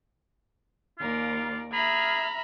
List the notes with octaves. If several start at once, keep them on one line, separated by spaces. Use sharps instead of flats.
D#2 F4 A#4 D5
G#4 E5 A#5 B5 F6